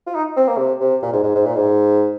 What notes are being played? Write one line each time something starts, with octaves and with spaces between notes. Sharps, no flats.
F4
D#4
C4
A#3
C3
C3
A#2
G#2
G#2
G#2
A#2
G#2